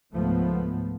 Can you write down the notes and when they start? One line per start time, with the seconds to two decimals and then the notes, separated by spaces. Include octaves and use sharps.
0.12 C#2 G#2 F3 A3 B3